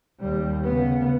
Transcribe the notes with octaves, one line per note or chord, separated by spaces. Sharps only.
D#2 G3
C#3 B3